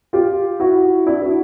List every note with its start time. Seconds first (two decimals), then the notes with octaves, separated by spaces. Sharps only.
0.13 F4 G4
0.60 E4 F#4
1.06 D4 E4
1.22 E4 F#4